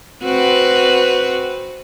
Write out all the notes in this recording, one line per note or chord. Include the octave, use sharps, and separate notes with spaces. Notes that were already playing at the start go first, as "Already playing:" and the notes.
C4 F#4 B4